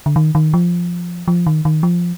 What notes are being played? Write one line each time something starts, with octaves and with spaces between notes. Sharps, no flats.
D3
D#3
D#3
F3
F3
D#3
D#3
F3